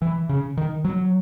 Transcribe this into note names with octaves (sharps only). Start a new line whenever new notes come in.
E3
C#3
D#3
F#3